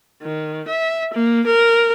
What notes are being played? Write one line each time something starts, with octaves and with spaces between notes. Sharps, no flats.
D#3
E5
A#3
A#4